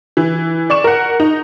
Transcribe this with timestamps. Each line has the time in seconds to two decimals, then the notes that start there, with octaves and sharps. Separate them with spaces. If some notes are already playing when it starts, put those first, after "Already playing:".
0.17 E3
0.70 D5 C#6 E7
0.84 A#4 F#5
1.20 D#4